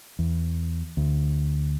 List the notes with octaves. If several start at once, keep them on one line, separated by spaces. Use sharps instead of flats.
E2
D2